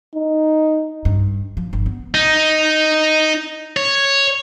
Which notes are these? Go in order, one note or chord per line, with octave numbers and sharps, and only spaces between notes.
D#4
G2
F3
G1
B3
D#4
C#5